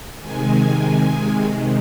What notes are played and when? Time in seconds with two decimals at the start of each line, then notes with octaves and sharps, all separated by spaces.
0.20 C3 D#3 G#3 G#5
1.07 C3 D#3 G#3